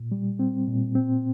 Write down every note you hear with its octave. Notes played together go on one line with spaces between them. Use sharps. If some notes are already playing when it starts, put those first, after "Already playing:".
Already playing: A#2
G3
C4
A#2
C4